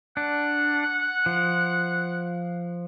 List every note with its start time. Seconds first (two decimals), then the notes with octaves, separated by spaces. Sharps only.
0.17 D4 F#5
1.26 F3